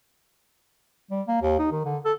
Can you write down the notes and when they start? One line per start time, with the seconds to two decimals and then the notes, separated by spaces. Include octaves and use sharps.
1.11 G3
1.28 A#3
1.42 D#2
1.59 D#4
1.72 D#3
1.85 D3
2.05 A4